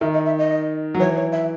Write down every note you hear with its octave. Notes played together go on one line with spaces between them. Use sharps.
D#3 E5
D#5
E5
D#5
F#3
E3 C#5
C#5
E5